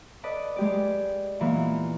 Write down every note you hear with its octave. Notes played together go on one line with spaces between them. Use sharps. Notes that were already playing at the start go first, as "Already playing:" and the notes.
A4 B4 D5 D#5
G#3 G4 D5
A#2 E3 A#3 B3